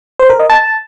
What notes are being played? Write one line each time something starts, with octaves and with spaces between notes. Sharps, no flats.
C5
A#4
D#5
A5